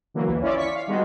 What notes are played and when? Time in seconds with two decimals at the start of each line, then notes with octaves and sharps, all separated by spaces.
0.14 D3 E3 F#3 A#3
0.26 A1 D#2 E3
0.41 C#4 E4 F4 D5
0.57 C#6 B6
0.75 F5
0.87 D#3 G3 G#3 B3 F#4